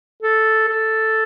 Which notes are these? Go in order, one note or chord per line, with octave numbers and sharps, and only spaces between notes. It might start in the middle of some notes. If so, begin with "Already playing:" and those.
A4
A4